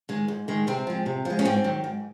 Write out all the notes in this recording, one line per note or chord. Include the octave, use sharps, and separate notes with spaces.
D#3 G#3
G#2
D#3 G#3
C3 C4
F3 G#3
C3
F3 G#3
C#4
G#2 C4
D#3 F#3
G#2